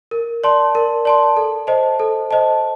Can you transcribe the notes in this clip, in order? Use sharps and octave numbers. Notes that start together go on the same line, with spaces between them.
A#4
D5 A5 C6
A#4
D5 A5 C6
A4
C5 D#5 A5
A4
C5 D#5 A5